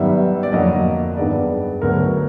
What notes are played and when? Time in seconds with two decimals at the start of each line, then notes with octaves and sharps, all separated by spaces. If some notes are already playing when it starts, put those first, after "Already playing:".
Already playing: F#2 D#3 G3 B3 E5
0.43 D5
0.52 F2 D3 F#3 A#3 D#5
1.17 G2 D#3 G#3 B3 D5
1.82 D2 D3 F#3 B3 A#4